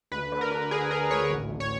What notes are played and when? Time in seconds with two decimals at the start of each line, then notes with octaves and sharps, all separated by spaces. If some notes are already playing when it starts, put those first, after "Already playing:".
0.11 D2 B4
0.32 D3
0.41 A#4
0.51 D3
0.71 D3 G#4
0.91 D3 A#4
1.10 D2 C#5
1.30 A1
1.50 A1
1.60 C#5